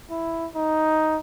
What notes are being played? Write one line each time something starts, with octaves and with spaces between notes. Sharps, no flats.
E4
D#4